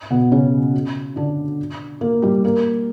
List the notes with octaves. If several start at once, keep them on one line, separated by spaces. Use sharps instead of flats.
B2 B3
C#3 C#4
D3 D4
A#3 A#4
G3 G4
A#3 A#4